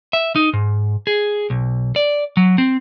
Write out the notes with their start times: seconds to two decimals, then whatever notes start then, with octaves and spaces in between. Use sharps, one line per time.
0.13 E5
0.36 D#4
0.53 G#2
1.07 G#4
1.50 B1
1.96 D5
2.37 F#3
2.58 C4